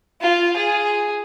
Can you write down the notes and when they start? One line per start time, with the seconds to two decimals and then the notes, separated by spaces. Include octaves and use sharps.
0.21 F4
0.57 G#4